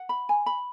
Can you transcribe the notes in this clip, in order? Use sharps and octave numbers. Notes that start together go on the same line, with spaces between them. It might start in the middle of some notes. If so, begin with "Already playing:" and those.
Already playing: F#5
B5
G#5
B5